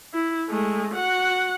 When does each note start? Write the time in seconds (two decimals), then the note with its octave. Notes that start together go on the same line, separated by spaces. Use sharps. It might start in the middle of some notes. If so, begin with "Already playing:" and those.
0.14 E4
0.50 G#3 A3
0.95 F#4 F#5